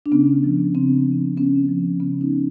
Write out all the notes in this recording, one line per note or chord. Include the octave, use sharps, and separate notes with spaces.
D4
C#3 B3 C#4
F3
C#3 C4 D4
F3
C#3 B3 C#4
F3
C#3 B3 C#4
C#4 D#4
F3